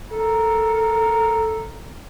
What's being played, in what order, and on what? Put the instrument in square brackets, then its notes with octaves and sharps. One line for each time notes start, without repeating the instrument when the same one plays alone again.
[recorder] A4 [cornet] A#4